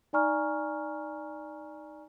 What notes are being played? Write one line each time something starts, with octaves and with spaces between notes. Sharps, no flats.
D#4 D5 G#5 A#5 C#6 F6